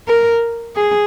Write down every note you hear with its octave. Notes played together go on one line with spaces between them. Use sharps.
A#4
G#4